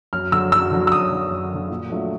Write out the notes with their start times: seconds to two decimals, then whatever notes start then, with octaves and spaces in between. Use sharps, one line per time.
0.13 F#2 F6
0.32 D3 F#3 E6
0.52 F#2 E6
0.71 D3 F#3
0.87 E6
0.91 F#2 D#6
1.11 D3 F#3
1.31 F#2
1.50 D3 F#3
1.70 A#2
1.90 F#3 A3 D4 F4